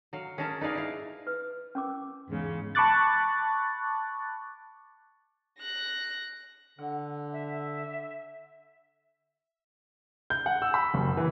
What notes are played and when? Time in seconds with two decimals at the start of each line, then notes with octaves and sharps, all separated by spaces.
0.13 F#3 F5
0.38 C#4 G#4 A#4 G#5 A5
0.61 D#4 B4 D5 F5 G#5
0.75 E4 F5
1.27 B4
1.75 C#4 A#4 D6
2.29 E2 G#2 C#3
2.75 A5 B5 C#6 D6 F#6 A6
5.58 F#6 A#6
6.79 D3 F#5
7.32 E5
10.30 G6
10.46 F#5
10.62 E6
10.74 B5
10.94 F#1
11.17 E3